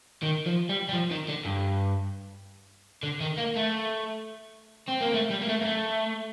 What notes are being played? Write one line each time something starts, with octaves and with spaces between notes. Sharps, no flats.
D#3
F3
G3
G3
F3
D#3
D3
G2
D3
D#3
A#3
A3
C4
A#3
A3
G3
A#3
A3
A#3
A3